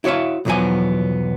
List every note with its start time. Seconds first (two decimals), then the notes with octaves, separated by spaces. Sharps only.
0.04 E4 F#4 C#5 E5 F5
0.45 B1 E2 F3 F#3 B3 G#5